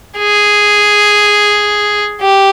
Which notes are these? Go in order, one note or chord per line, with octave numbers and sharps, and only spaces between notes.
G#4
G4